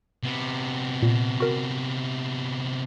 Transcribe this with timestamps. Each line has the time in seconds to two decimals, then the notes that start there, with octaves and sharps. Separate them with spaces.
0.23 C3 B3
1.02 A#2
1.40 F#4 A#4 C7